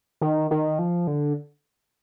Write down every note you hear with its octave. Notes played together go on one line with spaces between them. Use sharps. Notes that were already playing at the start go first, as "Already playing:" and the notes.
D#3
D#3
F3
D3